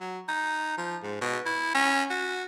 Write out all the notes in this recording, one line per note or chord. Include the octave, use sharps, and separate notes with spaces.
F#3
D#4
F3
G#2
B2
E4
C#4
F#4